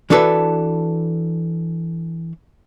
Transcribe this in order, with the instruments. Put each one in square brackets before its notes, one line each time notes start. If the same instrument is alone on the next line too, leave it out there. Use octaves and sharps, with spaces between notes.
[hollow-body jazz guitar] E3 D4 F#4 A4 B4